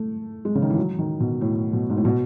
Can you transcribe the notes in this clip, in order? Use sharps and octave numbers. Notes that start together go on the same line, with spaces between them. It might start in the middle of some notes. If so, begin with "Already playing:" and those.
Already playing: A3
G#3
C#3
D#3
E3
F#3
D#3
B2
A2
B2
G#2
A2
B2